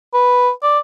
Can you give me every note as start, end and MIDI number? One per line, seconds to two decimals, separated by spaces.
0.14 0.50 71
0.63 0.79 74